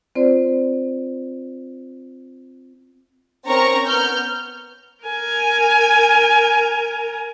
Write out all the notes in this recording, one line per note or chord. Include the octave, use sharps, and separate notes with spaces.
C4 F4 C5 D5
C4 C#4 A#4 A#5 C#6
B3 F6 G6
A#4 G#5